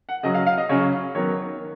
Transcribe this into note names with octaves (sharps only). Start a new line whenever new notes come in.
F#5
C#3 F#3 C#4 D#5
F5
F5
D#5
C#3 F#3 C#4 C#5
D#3 F#3 B3 C#5
D#3